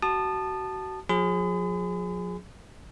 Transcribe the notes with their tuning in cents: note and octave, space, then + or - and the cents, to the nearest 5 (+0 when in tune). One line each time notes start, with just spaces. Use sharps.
F#4 +35 A5 +0 D#6 -30
F3 +45 G#4 +0 B5 +45